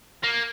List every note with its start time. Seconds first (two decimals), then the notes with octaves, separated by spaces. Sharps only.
0.23 A#3